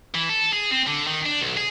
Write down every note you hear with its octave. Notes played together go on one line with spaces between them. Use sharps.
E3
A4
G#4
C4
D3
D#3
D4
B1
G#4